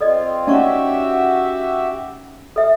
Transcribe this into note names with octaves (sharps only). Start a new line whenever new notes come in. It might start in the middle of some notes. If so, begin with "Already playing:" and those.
C4 F4 A4 D5 D#5
C#4 D#4 F#4 G4 D5 E5 A5 C#6
A4 E5